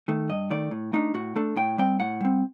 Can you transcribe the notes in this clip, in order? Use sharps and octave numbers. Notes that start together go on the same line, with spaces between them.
D#3 A3
G2 D#5
D#3 A3 D5
A2
A3 D4 D#4
A2 F#4
A3 D4 A4
A2 G5
G3 C4 G5
A2 F#5
G3 C4